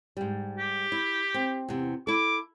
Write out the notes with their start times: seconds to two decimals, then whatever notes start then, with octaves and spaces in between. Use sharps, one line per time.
0.17 G#2 G3
0.58 G4
0.92 E4
1.34 C4
1.68 E2 C3
2.07 E4 A4 D6